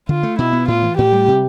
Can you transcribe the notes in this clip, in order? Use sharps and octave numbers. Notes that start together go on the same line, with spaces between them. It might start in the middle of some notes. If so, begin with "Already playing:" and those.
D3 F4
A3
B2 E4
B3
A2 F4
E3
A2 G4
G3
C3